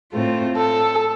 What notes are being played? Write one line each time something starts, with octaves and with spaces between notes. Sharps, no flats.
A2 A3 C4 F4
A4